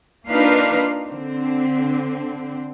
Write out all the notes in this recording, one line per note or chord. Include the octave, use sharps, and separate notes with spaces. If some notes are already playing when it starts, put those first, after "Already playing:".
A#3 D4 D#4 F4 B4 F5
D3 C4